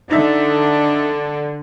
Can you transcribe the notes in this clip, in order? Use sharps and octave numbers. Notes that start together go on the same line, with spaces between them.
D3 D4 D#4 A4 E5